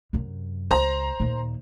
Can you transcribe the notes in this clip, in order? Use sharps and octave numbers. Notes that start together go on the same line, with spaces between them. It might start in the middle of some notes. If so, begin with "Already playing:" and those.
F#2 C3
C#2 C5 A#5
D#2 A#2